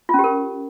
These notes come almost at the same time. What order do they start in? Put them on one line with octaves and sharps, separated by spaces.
F4 C#4 G4 A#4